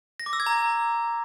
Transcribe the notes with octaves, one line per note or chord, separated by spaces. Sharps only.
A#6
D6
E6
G#6
A#5